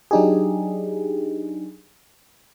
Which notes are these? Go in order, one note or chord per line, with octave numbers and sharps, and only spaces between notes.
F#3 D4 D#4 G4 G#4